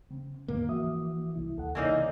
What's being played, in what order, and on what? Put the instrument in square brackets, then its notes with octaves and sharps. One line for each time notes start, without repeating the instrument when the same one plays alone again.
[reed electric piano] C#3 [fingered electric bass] C4
[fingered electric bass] D#1 D3 D#3 [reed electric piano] D#2 G#2 [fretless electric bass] A#3
[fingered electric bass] E3 F3 [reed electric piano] F#4 E5 D#6
[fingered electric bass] C2 [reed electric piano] E4
[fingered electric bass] D#2 [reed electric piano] A4 F#5
[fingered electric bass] C#2 C3 [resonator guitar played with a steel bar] E3 A#3 D#4 [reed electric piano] C#5 D5 G#5